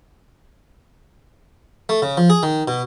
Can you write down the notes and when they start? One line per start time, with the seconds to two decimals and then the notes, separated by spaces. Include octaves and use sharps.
1.89 A3
2.02 C#3
2.17 F3
2.30 G#4
2.43 D#3
2.68 B2